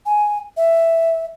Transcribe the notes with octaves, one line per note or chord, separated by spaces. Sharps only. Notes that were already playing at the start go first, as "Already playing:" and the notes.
G#5
E5